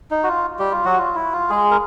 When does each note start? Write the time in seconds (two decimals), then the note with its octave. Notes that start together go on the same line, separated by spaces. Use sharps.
0.11 D#4
0.24 F#4
0.28 F4
0.59 G3 G4
0.71 F4
0.85 F#3 F#4
0.98 F4
1.15 E4
1.33 F4
1.50 G#3 G#4
1.71 A#4